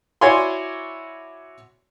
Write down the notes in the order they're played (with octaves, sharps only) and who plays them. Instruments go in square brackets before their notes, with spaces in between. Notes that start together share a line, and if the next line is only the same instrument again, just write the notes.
[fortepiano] E4 F#4 C#5 D5 G#5 C6